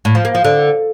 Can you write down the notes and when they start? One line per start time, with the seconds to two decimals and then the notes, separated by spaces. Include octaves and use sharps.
0.05 A2
0.15 F3
0.25 A#3
0.35 F3
0.45 D3